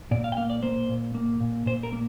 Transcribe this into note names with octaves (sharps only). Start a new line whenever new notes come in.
A#2 D5
F5
G5
A#3 F5
D5
A#3 C5
A#2
A#3
A#2
A#2 C5
A#4
A#3